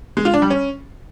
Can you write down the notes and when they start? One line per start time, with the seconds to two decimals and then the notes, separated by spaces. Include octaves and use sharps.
0.17 G#3
0.25 F4
0.34 D4
0.42 G3
0.50 C#4